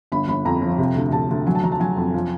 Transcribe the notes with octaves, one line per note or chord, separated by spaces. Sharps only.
G1 B5
G1 B5
F2 A#5
F3
C3
D2
C3 A5
D2
F#3 G#5
A5
F#3 A#5
A5
F#3 G#5
F2
F3